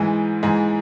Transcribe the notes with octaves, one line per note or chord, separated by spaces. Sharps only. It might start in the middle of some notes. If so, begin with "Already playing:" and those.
Already playing: G#2 E3 G#3
G#2 E3 G#3